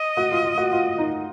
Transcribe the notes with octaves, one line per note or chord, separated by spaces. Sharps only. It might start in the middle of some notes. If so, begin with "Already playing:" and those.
Already playing: D#5
F#4
F4
F4
F#4
F4
D#4